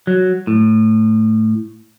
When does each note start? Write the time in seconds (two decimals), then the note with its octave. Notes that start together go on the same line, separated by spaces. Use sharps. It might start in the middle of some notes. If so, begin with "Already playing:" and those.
0.07 F#3
0.47 A2